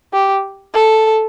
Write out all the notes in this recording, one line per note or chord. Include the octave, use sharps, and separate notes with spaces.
G4
A4